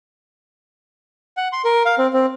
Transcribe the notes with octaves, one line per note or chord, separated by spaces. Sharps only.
F#5
C6
A#4
F5
C4
C4